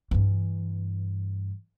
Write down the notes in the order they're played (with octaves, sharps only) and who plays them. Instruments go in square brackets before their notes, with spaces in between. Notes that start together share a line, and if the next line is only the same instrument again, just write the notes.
[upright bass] G2 E3